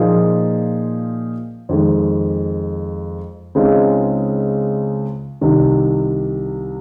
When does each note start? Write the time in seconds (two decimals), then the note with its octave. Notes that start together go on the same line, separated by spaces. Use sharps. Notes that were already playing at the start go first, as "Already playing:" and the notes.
Already playing: A#2 F3 A#3 D#4 G#4
1.69 F2 D#3 G#3
3.55 C#2 C#3 G#3 C4 D#4
5.41 C2 C3 D#3